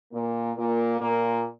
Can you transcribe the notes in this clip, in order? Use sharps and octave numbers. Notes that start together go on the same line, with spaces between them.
A#2 A#3
A#2 A#3
A#2 A#3